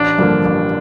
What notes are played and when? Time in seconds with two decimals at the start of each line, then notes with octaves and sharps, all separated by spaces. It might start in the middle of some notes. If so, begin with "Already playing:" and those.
Already playing: A1 D4
0.18 G2 D3 F3 A#3
0.45 A1